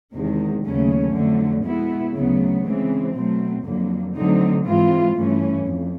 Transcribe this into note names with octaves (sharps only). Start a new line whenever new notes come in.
E2 C3 D#3 G#3
D#2 C#3 F#3 A3 C#4
F2 D3 F#3 A3
B2 G#3 B3 E4
D2 C#3 F#3 B3
C#3 E3 G#3 C4
B2 F#3 A3 C4
F2 D3 F#3 A#3
D3 F#3 A3 C4 D#4
G#2 E3 G#3 C4 F4
G2 E3 A3 C#4
F2